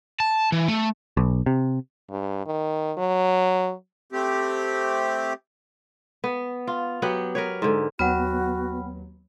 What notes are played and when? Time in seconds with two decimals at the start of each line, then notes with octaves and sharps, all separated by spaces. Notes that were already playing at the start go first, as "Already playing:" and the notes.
0.20 A5
0.52 E3
0.68 A3
1.17 B1
1.46 C3
2.10 G2
2.46 D#3
2.98 F#3
4.12 A3 C4 G4
6.24 B3
6.67 F4
7.02 F#3 B3 G4 F#5
7.35 A#4 B4 C#5
7.62 G#2 D3
7.99 D#2 F#3 B3 F#4 B4 F#5 G5 F6